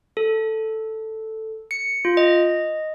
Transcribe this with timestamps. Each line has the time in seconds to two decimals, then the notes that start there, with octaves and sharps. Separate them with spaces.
0.17 A4
1.71 C#7
2.05 F4
2.17 D#5